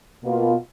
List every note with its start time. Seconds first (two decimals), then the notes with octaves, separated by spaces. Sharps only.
0.24 B2 A#3 F4